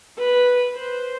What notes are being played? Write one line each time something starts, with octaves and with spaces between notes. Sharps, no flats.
B4
C5